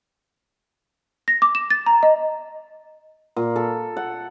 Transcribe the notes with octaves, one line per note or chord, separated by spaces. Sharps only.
A#6
D6
E7
A6
A#5
D#5
A#2
A4
F#5